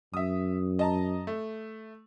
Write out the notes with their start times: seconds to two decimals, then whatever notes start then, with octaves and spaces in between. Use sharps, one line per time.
0.14 F#2 E5 D#6
0.79 D#5 A5 A#5
1.27 A3